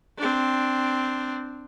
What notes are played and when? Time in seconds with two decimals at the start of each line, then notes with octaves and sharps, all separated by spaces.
0.18 C4 D4